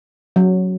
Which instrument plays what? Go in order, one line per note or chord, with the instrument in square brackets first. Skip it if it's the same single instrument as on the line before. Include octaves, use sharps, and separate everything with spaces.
[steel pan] F#3